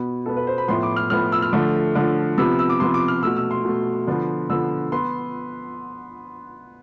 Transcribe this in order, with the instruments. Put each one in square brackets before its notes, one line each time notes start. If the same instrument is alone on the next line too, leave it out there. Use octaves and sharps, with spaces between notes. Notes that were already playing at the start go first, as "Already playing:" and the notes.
Already playing: [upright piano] B2 B3
B2 B3 A4
B4
C5
B5
A2 F3 B3 C6
D6
F6
A2 F3 B3 F6
E6
F6
D3 F3 A3
D3 F3 A3
C3 F3 B3 E6
E6
D6
C3 F3 B3 C6
D6
F6
B2 A3 E6
E6
C6
B2 A3
D3 F3 B3
D3 F3 B3 E6
B3 C6